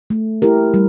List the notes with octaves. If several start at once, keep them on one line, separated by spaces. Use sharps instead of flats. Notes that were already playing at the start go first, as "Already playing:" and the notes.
A3
E4 G4 A#4
G3